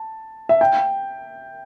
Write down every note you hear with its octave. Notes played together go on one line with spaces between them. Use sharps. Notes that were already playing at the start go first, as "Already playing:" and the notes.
Already playing: A5
E5
G5